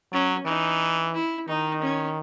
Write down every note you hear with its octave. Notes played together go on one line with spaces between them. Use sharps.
F#3 C#4
E3 D#4
E4
D#3 D#4
C#4